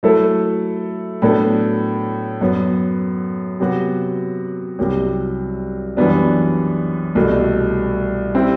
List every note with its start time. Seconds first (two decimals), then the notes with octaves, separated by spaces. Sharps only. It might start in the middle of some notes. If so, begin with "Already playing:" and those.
0.03 F#3 A3 E4 A4
1.22 A2 F#3 B3 D4 A4
2.41 F#2 F#3 B3
3.60 C3 F#3 B3 F#4
4.79 C2 C3 F#3
5.97 F#2 E3 G3 B3 D4
7.15 C2 B2 A3
8.35 G3 C4 E4